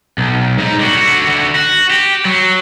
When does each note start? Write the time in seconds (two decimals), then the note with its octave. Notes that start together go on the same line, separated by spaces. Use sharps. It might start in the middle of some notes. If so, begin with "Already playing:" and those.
0.18 B1
0.58 G#2 D#4
0.80 D3 F#4
1.55 F#4
1.91 G4
2.25 F#3